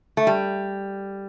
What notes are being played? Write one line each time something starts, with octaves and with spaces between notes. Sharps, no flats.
A3
G3